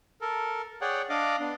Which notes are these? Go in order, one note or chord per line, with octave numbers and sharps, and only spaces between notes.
A4 A#4
G#4 C#5 D5 F#5 G5
D4 D5 D#5 F5 D6
B3 D4